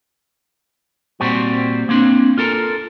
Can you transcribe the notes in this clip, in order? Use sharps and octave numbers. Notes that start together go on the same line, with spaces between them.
A#2 G3 C4 F#4
A#3 C4 D4
F4 A4 A#4